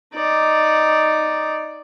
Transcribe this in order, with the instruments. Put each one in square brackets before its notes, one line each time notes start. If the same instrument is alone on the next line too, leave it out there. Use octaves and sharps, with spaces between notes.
[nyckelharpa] D#4 D5